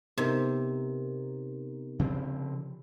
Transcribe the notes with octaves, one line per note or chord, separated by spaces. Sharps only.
C3 B3 D#4 A#4
C#3 F3 C4